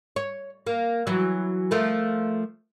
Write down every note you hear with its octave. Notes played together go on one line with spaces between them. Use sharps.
C#5
A#3
E3 F#3
F3 A3 A#4